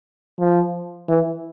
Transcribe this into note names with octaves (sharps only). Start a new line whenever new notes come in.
F3
E3